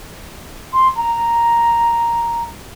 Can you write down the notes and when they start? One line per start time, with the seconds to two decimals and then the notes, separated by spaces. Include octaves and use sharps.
0.72 C6
0.95 A#5